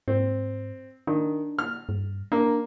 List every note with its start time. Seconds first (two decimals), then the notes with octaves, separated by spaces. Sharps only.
0.08 G#2 C4
1.07 D#3 D4
1.59 F6
1.89 G2
2.32 A#3 D4